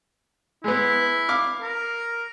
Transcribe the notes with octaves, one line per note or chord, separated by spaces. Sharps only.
G#3 B3 E4
F5 D6 F6
A#4